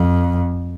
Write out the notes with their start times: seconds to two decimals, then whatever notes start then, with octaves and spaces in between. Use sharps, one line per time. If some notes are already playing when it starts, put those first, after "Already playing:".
Already playing: F2